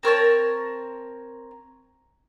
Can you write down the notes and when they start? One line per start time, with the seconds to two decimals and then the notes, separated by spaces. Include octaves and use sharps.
0.03 C4 A#4 C#5 A5